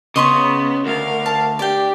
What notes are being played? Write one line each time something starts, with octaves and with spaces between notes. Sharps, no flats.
C#3 B3 D#5 C6 C#6
D2 A#4 F5
A5
D4 G4 D5 G5